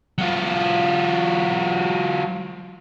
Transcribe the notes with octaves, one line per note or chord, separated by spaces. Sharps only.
F#3 F4